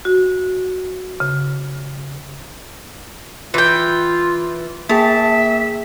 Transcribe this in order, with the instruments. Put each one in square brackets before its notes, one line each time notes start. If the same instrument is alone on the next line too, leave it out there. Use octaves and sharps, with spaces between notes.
[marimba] F#4
C#3
[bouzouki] E3 G5 [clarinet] F4
[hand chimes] A#3 G#4 G5 [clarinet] E5 [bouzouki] A5